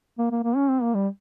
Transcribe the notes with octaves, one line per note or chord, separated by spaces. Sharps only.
A#3
A#3
A#3
C#4
C4
A#3
G3